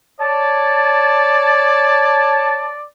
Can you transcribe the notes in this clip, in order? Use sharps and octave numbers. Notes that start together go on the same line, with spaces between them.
C#5 D5 A5